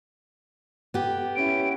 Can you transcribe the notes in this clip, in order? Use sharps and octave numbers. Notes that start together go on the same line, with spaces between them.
B3 G4
C#4 E4 D7